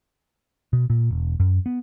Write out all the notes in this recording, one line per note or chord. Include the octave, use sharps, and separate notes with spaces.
B2
A#2
E1
F#2
B3